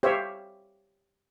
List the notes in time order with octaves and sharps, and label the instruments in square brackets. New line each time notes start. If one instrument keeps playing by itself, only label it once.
[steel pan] G4 C5 C#5 E5 F5